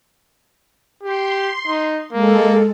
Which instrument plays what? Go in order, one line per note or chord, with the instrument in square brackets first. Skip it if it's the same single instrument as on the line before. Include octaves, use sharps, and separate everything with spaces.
[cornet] G4 [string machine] C6
[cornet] D#4
[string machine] G#3 A4 [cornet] A#3